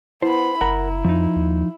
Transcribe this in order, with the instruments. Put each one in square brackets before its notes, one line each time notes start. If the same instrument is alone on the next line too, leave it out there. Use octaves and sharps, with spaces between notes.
[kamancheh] B3 B5 [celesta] E4 [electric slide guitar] C5
[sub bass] F#1 [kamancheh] E4 [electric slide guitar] A#4 F#5 [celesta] A#5
[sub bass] F2 [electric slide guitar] F3 D#4
[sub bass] D#2